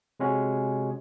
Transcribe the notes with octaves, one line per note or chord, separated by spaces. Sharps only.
C3 G#3 C#4 F#4